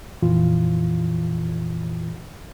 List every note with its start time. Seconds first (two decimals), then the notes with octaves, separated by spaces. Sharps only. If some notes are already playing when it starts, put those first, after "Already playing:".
0.22 F2 A#2 E3 F4